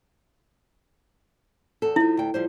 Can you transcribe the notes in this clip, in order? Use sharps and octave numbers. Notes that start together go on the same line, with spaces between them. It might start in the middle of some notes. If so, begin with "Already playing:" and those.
E2 A4
F3 D#4 E4
D2 G5
F3 G3 C5